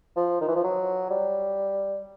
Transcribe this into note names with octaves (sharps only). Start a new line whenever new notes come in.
F3
D#3
E3
F3
F#3
G3